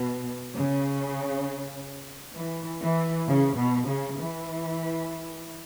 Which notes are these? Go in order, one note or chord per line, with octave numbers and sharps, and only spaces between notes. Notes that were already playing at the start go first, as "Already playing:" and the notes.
Already playing: B2
C#3
E3
E3
C#3
B2
C#3
E3